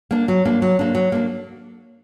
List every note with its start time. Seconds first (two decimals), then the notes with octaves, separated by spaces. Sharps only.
0.11 A#3 D4
0.28 F#3
0.45 A#3 D4
0.62 F#3
0.79 A#3 D4
0.95 F#3
1.12 A#3 D4